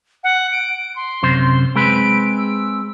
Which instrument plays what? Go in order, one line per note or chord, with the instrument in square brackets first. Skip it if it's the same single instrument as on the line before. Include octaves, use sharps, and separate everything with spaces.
[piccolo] F#5
D7
C6
[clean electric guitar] F#2 C3 C5
[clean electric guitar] G#3 C4 B4 [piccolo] D7
[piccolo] E6